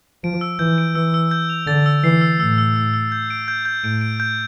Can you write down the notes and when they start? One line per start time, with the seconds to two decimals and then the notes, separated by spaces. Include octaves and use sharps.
0.24 F3 D7
0.41 E6
0.59 E3 G6
0.78 D7
0.95 E3 E6
1.14 E6
1.31 G6
1.49 F7
1.67 D3 A6
1.86 E6
2.04 E3 C7
2.21 E6
2.40 A2 E6
2.58 E6
2.76 E6
2.94 E6
3.12 G6
3.30 D7
3.48 G6
3.65 G6
3.84 A2 D7
4.01 D7
4.20 G6